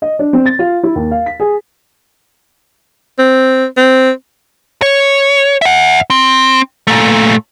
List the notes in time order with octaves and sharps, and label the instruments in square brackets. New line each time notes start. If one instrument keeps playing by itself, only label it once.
[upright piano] D#5
D4
C4
A6
F4
E4
D#2
F5
B6
G#4
[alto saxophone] C4
C4
[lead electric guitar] C#5
E5 F#5
C4
A#2 A3